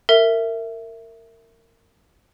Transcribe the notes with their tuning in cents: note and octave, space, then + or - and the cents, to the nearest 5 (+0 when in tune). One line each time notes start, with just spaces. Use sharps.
A#4 -25 E5 +0